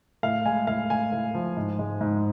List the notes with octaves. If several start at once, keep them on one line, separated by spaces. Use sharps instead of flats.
A2 F5
G#3 G#5
A2 F5
A2 G#5
A2
F3
G#2
G#3
G#2